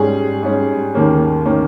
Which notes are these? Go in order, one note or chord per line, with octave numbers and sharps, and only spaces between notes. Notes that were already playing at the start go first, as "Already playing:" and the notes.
Already playing: G#2 G3 C#4 G#4
G#2 G3 C#4
D#2 D#3 A#3 C#4
D#3 A#3 C#4